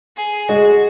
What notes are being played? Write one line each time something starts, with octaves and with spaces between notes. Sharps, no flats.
G#4
G#3 F#4